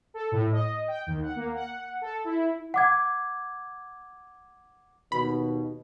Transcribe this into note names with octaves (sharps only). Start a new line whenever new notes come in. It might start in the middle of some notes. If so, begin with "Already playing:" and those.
A4
A2
D#5
G5
D#2
F#5
A#3
F#5
A4
E4
F#5 D6 G#6
D#2 B2 B5